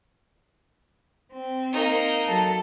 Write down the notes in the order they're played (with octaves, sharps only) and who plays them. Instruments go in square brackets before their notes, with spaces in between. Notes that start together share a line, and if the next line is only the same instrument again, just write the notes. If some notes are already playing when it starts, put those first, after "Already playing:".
[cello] C4
[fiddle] A#3 D#4
[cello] F#3 A4